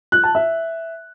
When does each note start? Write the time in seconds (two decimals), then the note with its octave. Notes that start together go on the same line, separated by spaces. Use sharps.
0.12 F#6
0.23 A5
0.35 E5